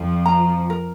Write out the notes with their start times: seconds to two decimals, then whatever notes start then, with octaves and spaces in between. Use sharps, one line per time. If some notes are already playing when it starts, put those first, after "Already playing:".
Already playing: F2 F3
0.26 A#5
0.70 A#4